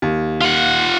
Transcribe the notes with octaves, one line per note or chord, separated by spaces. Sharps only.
D#2
F4 F#5